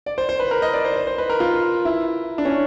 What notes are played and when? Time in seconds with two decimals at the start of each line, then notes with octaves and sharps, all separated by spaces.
0.06 D5
0.18 C5
0.29 C5
0.40 B4
0.51 A#4
0.62 D#5
0.73 D5
0.85 C5
0.96 C5
1.07 C5
1.18 B4
1.30 A#4
1.40 F4
1.85 E4
2.38 D4
2.45 C#4